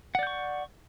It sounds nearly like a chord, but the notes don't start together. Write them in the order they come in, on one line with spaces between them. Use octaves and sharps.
F#5 D5 G6 C#6